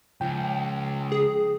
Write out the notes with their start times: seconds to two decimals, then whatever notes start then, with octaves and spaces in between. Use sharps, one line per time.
0.21 C#2 F3 G5
1.12 G#4